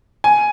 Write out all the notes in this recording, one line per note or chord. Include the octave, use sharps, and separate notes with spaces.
G#5